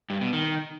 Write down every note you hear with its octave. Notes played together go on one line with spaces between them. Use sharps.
G2
B2
D#3